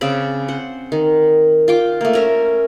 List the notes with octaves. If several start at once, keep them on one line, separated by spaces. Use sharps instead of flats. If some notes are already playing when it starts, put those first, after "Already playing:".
C#3 C4 D5 B5
C5 F#5
D#3
F4 G5 D6
A3 A#3
C#4 A#4 E5